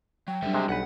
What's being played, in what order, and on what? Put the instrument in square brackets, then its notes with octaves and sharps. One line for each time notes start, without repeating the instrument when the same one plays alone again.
[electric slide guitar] F#3 [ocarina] G5
[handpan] F#3 G3 D4 [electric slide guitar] A4 C5 E5
[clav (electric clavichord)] C3 G#3
[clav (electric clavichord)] B1 B4 [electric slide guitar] F#5